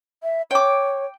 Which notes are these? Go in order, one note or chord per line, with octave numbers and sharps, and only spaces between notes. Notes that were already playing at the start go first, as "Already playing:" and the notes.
E5
C#5 G5 D6